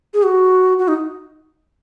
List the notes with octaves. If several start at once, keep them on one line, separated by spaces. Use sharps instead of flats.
G#4
F#4
F#4
D#4